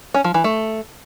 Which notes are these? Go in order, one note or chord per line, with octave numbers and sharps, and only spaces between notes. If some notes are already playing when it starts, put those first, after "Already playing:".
C#4
F3
E3
A3